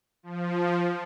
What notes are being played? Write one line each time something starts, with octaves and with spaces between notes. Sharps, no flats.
F3